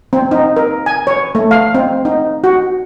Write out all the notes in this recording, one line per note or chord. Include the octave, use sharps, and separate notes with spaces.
C4
D#4
A#4
G#5
C#5
A3
F5
C4
D#4
F#4